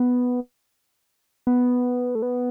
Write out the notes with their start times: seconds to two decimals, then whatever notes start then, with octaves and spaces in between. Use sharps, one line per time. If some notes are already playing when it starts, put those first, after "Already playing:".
Already playing: B3
1.47 B3
2.15 A3
2.22 B3